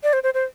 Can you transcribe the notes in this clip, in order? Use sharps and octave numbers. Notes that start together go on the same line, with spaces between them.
D5
C5
C5
C5